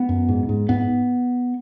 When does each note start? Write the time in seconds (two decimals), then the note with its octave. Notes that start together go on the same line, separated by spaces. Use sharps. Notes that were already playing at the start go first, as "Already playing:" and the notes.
Already playing: B3
0.09 F#2
0.29 G#2
0.49 G#2
0.69 G#2 B3